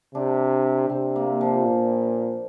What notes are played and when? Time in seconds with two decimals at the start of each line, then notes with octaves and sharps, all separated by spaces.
0.14 C3 D4
0.89 C3 C4
1.16 A#3
1.41 F3
1.66 A#2